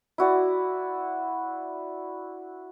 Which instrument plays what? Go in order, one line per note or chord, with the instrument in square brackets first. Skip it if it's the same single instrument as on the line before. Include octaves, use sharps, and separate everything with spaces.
[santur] E4 F#4 D5